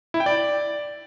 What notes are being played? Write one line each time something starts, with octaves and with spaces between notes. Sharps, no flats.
E4
G5
D5